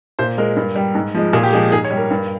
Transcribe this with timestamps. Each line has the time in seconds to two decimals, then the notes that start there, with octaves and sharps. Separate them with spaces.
0.19 A#2 C5
0.38 G#3 A#4
0.56 G2
0.76 G3
0.95 G#2
1.14 F3 G#3
1.33 A#2 G#4
1.43 G4
1.53 F3 G#3 G#4
1.72 G#2 G#4
1.84 C#5
1.91 G3
1.97 A#4
2.11 G2